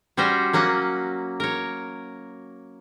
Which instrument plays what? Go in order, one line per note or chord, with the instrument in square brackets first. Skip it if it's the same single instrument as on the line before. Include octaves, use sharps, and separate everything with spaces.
[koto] G3 C#4 F#4 C5 G5 A#5
F#3 A#3 C#4 F#5
A#4 C#5